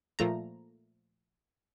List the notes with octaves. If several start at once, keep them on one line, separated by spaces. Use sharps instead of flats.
A#2 F3 A3 A#5